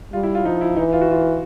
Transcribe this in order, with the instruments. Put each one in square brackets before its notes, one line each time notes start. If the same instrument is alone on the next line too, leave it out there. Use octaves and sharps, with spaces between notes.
[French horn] G3 [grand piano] F4
[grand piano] E4
F4
[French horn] F3 [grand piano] D#4
[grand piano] E4
[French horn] E3 [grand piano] D#4
[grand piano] F4
F#4
F4